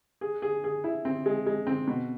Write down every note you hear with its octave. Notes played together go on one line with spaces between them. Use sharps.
G#4
G#4
G#4
E4
C4
G#3
G#3
C4
B2